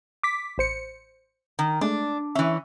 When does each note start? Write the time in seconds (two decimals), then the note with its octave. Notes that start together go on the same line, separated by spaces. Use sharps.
0.23 D6 B6
0.58 A1 C5 C#7
1.59 D#3
1.81 G#3 A3 D4
2.35 E3 C#4 E5